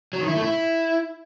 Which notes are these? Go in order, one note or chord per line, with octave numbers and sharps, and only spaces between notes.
F#3
D#3
E4
A3
E4